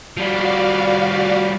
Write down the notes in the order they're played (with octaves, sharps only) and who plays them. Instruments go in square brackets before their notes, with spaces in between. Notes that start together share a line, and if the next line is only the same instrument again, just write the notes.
[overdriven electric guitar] F3 G3 [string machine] F#4 D5 F5